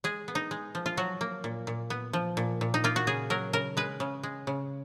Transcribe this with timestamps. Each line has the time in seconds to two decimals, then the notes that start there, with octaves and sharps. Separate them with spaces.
0.04 G#3 G#4
0.28 B3
0.35 D#4
0.51 G#3
0.75 F3
0.86 F4
0.97 F#3 F#4
1.21 A#3
1.44 A#2
1.67 A#2
1.90 B3
2.13 F3
2.37 A#2
2.61 A#2
2.74 D#4
2.84 A#3 F4
2.96 F#4
3.07 C#3 G#4
3.30 F#3 A#4
3.53 C#3 A#4
3.77 G#3 B4
4.00 C#3
4.23 G#3
4.47 C#3